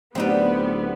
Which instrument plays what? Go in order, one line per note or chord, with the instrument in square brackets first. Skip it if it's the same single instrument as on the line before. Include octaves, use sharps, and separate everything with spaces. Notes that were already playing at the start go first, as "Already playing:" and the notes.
[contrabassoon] D1 [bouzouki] D3 G3 [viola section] B3 [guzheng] C4 D#4 B4